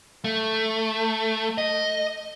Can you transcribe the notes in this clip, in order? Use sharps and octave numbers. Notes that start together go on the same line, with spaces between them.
A3
D#5